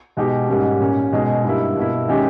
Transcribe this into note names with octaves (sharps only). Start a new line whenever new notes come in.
B2 G#3 D#4 G4
G#2 G3 A#3 C#4
A#2 A#3 C#4
B2 G#3 D#4 G#4
G2 G3 A#3 E4
B2 A#3 E4
D#3 G#3 C#4 G4